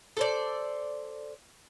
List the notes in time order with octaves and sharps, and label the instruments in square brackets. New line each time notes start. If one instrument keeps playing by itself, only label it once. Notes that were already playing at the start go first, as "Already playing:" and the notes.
[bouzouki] A4 C5 D5